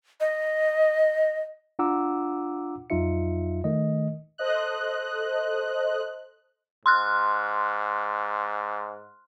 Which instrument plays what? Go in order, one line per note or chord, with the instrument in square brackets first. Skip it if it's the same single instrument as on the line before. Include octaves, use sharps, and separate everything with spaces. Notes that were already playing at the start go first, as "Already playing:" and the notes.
[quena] D#5
[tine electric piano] D4 F4 F#5 A#5 D6 E6
F2 F#3 D#4 F4 E5 C#7
D#3 A3 D#5
[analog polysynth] A4 C5 D#5 F#6
[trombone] G#2 [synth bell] C6 F6 F#6